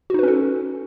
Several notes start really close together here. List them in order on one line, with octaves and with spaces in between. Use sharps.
F#4 D#4 B4 C#4 A4